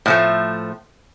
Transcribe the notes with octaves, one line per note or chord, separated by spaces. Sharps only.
A2 F3 A3